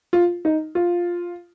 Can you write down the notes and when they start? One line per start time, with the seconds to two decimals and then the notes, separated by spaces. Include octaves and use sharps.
0.13 F4
0.45 D#4
0.75 F4